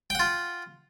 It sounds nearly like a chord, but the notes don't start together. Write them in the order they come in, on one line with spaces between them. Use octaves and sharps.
G5 F#5 F4